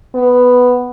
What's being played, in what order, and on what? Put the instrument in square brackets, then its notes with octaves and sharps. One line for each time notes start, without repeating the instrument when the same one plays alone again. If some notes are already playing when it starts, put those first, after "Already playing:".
[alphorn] B3